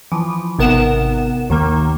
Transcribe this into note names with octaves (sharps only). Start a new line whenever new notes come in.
E3 F3
G#1 C3 B3 A#4 F#5 E7
D#2 D#3 A#3